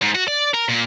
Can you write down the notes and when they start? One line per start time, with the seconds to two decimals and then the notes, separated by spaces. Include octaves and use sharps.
0.02 G#2
0.15 F#4
0.28 D5
0.54 A#4
0.69 A#2